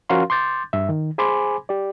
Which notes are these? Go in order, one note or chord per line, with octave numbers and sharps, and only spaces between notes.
F3 C#4 F#4 A#4 F5 C6
C6 D6 G6 A6
G2 E5
D#3
G#4 C5 G#5 B5 C6 D6
G4 D5